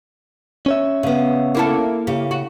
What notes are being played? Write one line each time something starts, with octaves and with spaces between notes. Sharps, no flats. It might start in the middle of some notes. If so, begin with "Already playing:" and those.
C#4 C#5 E5
C#3 B3
A#3 E4 A4
C#3 G4
F#4